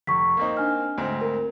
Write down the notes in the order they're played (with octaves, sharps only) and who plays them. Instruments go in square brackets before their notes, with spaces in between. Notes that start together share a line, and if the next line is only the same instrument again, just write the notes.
[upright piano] F1 [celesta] C#6 B6
[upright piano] A#3 C4 D#4
[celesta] D4 G#5 F6
[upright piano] D2 G#2 C4
[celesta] A#4